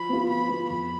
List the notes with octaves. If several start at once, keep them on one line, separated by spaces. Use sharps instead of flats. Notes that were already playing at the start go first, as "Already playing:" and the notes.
Already playing: F3 B5
B3 F4
F3 B5
B3 F4
F2 B5